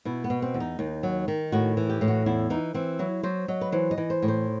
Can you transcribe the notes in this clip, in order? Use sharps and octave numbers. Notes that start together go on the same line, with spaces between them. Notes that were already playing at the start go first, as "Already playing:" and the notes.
B2 E4
B3
B2
C4
E2
D#4
D#2
F#3
D#3
A2 F#4
E3
G4
A2
F#4
E2 E4
E3 D#4
E3 C4
F#3 E4
F#3 C5
F#3 D#5
B4
E3 C5
D#5
E3
C5
A2
C5